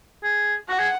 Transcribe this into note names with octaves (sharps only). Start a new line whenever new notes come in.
G#4
F#4 F#5
G#4